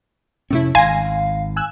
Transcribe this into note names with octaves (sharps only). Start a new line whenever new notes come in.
F2 A2 C3 A3 C#4 E4
G#1 F5 G#5 C6 A#6
G#5 E6 F#6